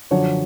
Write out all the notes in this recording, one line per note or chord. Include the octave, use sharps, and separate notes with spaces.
F#2 D3 F3 C#5